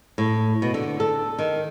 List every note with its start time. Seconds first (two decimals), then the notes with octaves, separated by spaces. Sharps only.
0.18 A2
0.62 B2
0.74 D3
1.00 A4
1.39 D#3